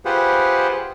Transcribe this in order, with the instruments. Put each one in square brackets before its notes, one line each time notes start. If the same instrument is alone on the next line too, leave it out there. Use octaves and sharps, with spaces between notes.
[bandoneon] F4 G4 G#4 B4 C5 F#5